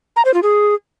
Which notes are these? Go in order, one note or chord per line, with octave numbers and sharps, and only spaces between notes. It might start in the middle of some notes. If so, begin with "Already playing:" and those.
A#5
C5
F4
G#4